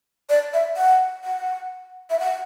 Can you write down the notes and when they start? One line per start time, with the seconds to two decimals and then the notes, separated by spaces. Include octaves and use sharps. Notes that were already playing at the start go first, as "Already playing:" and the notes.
0.29 D5
0.54 E5
0.77 F#5
1.24 F#5
2.10 E5
2.20 F#5